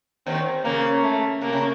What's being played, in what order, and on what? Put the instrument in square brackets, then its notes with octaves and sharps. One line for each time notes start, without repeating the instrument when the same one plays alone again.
[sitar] D#2 D#3 [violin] C4
[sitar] C#3 [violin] A#3
[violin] A3
[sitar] C3 [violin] A#3
[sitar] C#3